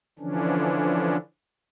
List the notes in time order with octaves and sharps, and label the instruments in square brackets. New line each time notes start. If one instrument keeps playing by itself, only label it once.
[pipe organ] D3 E3 F3 C#4 D4